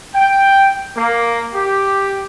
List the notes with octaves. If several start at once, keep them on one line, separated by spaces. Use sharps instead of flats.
G5
A#3
G4